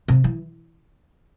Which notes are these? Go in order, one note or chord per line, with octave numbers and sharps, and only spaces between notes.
C3
E3